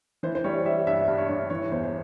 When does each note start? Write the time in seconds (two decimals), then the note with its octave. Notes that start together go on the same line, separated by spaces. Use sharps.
0.23 E3 C5
0.35 C5
0.44 G3 C#5
0.65 G3 E5
0.87 G2 E5
1.08 G2
1.18 C#5
1.29 G2
1.50 E3 C#5
1.72 E2 C5
1.83 C5